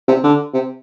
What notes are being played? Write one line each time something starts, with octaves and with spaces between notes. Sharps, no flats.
C3
D3
C3